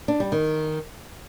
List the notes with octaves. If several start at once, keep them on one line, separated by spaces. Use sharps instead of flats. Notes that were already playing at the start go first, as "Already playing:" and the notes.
D4
G3
D#3